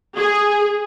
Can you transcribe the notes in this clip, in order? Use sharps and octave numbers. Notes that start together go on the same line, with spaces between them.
G#4